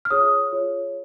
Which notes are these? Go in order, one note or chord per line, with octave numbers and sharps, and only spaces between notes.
F6
F4 G#4 C#5 D#6
F4 G#4 C#5